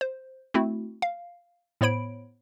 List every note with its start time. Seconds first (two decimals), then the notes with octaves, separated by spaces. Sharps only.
0.01 C5
0.54 A3 C4 E4 F#4
1.02 F5
1.81 A2 B3 C5 C#5 B5 D7